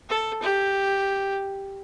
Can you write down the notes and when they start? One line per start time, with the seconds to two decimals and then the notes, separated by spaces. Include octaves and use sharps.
0.10 A4
0.43 G4